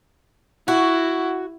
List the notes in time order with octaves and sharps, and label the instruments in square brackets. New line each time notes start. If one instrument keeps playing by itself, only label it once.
[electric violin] E4 [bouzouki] F#4